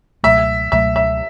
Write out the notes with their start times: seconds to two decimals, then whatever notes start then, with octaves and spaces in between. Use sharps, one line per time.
0.23 C#2 B2 F#3 A3 E5
0.72 C#2 B2 F#3 A3 E5
0.96 E5